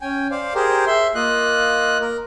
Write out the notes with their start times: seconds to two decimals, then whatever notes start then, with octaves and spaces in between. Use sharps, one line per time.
0.01 C#4 G5 G#5
0.31 C5 D5 F5
0.55 G4 G#4 A#4 C5
0.87 E5 C6
1.15 A#3 F4 D#5 F#6
2.01 A#4